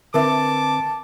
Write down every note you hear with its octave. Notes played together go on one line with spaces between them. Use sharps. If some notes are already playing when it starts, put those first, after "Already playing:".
D3 C4 A#4 B4 E5 A5 D6